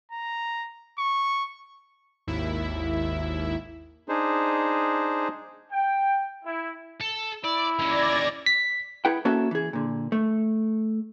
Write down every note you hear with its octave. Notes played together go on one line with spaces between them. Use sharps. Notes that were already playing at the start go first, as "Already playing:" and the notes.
A#5
C#6
G#1 D#2 E4 E5
D4 D#4 G#4 C5
G5
E4
A4
E4 D5
D#2 C#4 D5 G#6 A#6
B6
E4 G#4 B4 F#5 G5
A#3 C#4 F#4 A4 E5 A5
E3 G#4
A#2 D3
A3